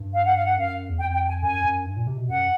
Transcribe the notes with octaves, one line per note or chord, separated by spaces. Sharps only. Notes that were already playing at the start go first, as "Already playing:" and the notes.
Already playing: G2
F5
F#5
F5
F#5
F#2 F5
E2
F2 G5
G5
G#5
F#2 G#5
F#2
G2
A#2
C3
B2
F#2 F#5